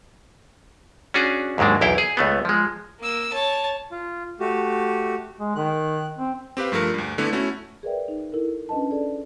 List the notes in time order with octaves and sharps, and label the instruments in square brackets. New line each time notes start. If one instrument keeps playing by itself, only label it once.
[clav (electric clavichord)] C#4 D4 F#4 G#4
D#2 G#2 F#3 G#3 D4
B1 E2 E4 F5 G5
G#4
C#2 A3 B3
F3 G#3
[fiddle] A#3 E6
C#5 A5
[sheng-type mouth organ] F4
A3 F#4 G4
[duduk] G#3
[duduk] D#3 [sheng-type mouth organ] F#6
[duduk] C4
[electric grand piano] C4 G4 B4 F5
G2 F3 A3 A#4
D2 G2
D3 A3 B3 E4
A3 C#4 E4 F#4
[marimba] G#4 A#4 B4 D5 E5 G5
D#4
E4 A4 A#4
C#4 D4 B4 D#5 A5
G#4 A4 D5